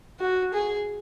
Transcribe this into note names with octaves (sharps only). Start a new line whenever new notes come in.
F#4
G#4